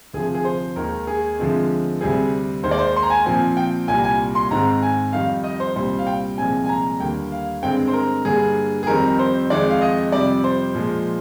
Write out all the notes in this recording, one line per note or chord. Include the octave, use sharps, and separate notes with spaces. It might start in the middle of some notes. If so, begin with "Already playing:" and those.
D2 C3 F3 G#4
G#4
C5
D#2 D#3 G#3 A#4
G#4
D2 D3 F3 G#3 C4
D2 C3 G3 C4 G#4
D#2 D#3 G#3 C5
D5
C5
C6
A#5
G#5
A#2 F3 C4 G#5
G5
C2 A#2 G3 G#5
G#5
C6
G#2 D#3 G#3 C4 A#5
G#5
F2 D#3 G3 F5
D#5
C5
C2 A#2 G3 C4 C5
F5
G5
C2 A#2 F3 G#3 C4 G#5
G#5
A#5
D#2 D3 G3 A#3 G5
F5
G2 D3 G#3 C4 G5
C5
A#4
G2 D3 G3 A#3 G#4
G#4
F2 D#3 G3 C4 A#4
C5
F2 D#3 G#3 D5
F5
D#5
F2 C3 G3 D5
C5
A#2 F3 G#3